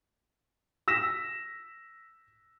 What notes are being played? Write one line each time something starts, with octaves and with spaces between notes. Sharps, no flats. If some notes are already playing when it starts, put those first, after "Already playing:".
E6 A#6 B6 E7